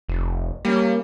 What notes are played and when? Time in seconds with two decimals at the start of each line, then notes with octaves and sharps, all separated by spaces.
0.09 F1
0.65 G3 A#3 C#4